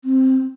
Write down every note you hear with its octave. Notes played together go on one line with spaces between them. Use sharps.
C4